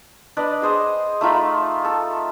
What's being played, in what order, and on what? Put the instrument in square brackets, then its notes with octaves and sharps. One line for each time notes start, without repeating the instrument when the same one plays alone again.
[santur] D4 B4 D5 D#5
G#4 C5 D#5
A3 D#4 F4 B5
A4